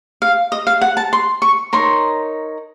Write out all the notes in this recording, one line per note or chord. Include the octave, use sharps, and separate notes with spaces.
F5
D#5
F5
F#5
A5
C6
C#6
D#4 A#4 C#5 C6